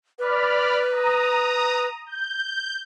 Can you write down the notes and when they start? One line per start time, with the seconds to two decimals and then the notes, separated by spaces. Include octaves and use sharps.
0.19 B4 D5 B5 F6
0.91 A#5 D#6
2.06 G6